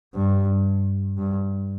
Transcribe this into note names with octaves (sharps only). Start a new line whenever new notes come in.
G2
G2